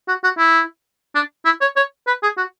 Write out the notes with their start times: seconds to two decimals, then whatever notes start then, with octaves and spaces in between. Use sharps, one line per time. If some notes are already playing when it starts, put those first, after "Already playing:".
0.08 F#4
0.24 F#4
0.38 E4
1.15 D4
1.46 E4
1.61 C#5
1.76 C#5
2.07 B4
2.23 G#4
2.38 F#4